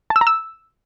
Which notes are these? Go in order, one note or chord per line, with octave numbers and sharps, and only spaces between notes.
A5
E6
A#5
E6